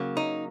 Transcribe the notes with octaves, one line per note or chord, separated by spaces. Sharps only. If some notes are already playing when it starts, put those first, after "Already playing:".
Already playing: C#3 F#3 A#3
D#4